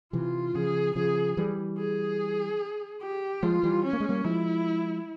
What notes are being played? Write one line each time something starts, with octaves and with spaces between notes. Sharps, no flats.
C3 E3 F4
C#3 F3 G#4
C#3 F3 G#4
E3 G3
G#4
G4
F3 G#3 F4
E3 G3
C#4
A#3
G#3
G3 A#3
F3 G#3 E4